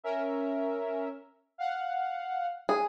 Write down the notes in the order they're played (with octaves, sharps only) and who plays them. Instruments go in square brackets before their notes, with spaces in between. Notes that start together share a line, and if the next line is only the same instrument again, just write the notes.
[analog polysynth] C#4 A#4 E5
F5 F#5
[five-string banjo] G#4